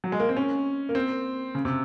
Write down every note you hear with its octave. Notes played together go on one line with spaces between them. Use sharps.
F#3
G#3
A#3
C4
C#4
A#3
C4
C#3
C3